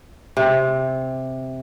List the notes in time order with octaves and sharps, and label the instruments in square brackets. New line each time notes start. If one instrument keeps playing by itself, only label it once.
[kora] C3